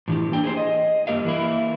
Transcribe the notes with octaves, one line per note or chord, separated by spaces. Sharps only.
A2 E3 D#4 E4 G4
A#3 D4 G5
G#4 B4 C5
D#5
G2 A#3 G4 A#4 F5
E3 A#3 E4